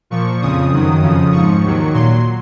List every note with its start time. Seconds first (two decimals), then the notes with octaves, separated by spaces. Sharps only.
0.10 A#2 F3 C#6
0.42 F2 C#3 F3 D#6
0.72 F#2 D#3 F#3
1.02 F2 C#3 F3
1.33 G#2 F3 C#6
1.64 D#2 D#3 F#3
1.93 A#2 F#3 C6